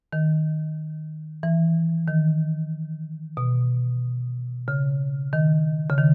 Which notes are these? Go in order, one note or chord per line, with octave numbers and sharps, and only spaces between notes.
D#3
E3
D#3
B2
C#3
D#3
C#3
D#3